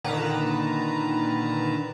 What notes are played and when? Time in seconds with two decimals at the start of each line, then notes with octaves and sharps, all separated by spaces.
0.04 A#2 D3 D#3 B4 A5 A#5